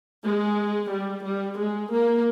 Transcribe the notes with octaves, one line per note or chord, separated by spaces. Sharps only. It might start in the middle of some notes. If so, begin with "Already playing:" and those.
G#3
G3
G3
G#3
A#3